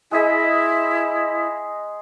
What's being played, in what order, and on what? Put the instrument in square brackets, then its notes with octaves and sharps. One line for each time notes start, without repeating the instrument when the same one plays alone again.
[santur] G#3 G#4 D#5 [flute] E4